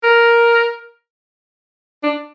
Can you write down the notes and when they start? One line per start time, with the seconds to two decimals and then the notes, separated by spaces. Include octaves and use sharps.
0.04 A#4
2.04 D4